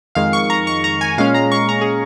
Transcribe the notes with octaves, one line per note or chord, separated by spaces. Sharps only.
F2 D#3 G#3 F5
C#6
A#5
C#6
A#5
G#5
A#2 G#3 C#4 F5
A#5
C#6
A#5
G#4